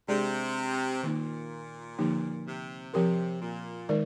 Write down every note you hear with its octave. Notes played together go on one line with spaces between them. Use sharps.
C3 G#3 D4 G#4 D5
A#2 D#3 A#3 D#4
D3 F3 A#3 D#4 G4
C3
C3 F3 C4 G4 A#4
A#2
D#3 G#3 D#4 A#4 D5